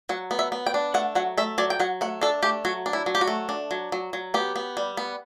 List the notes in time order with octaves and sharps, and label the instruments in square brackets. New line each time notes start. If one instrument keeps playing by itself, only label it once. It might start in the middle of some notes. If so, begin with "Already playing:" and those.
[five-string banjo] F#3 F#5
B3
E5
B3
G5
D4
A3 F#5
F#3 F#5
A3 E5
F#3 D5
G5
F#3 F#5
A3 F#5
D4 A4
A3 G4
F#3 F#4
D4
E4
F#3
G4
F#4
A3
D4
F#3
F#3
F#3
B3 G4
B3
G3
B3